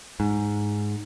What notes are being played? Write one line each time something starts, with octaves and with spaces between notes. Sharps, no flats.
G#2